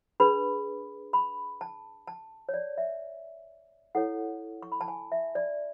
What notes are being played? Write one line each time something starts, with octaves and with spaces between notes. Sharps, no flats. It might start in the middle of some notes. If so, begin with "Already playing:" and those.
D4 G#4 B4 B5
B5
A5
A5
C#5
D5
E5
E4 A4 C#5 F#5
C#6
B5
A5
G#5
E5
D5